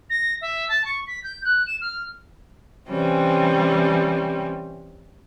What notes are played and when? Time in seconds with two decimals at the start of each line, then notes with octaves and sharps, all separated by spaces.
0.10 A#6
0.41 E5
0.69 A5
0.85 C#6
1.07 B6
1.24 G6
1.45 F#6
1.67 E7
1.81 F6
2.89 C3 E3 G3 C4 C#4